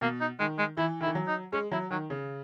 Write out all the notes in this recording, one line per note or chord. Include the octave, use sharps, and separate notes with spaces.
B2 A#3
D#4
D#3 G#3
G#3
E3 E4
D#3 E4
E3
F#3
D#4
G#3 C#4
F#3 E4
D#3 F#3
C#3